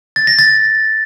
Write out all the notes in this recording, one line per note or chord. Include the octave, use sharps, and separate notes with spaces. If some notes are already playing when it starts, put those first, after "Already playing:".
A6
A#6
A6